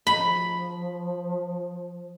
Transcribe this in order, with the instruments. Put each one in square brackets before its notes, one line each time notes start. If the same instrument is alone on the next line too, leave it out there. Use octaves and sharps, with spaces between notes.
[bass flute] F3 [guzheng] B5